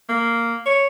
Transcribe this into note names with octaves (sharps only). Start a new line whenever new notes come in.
A#3
C#5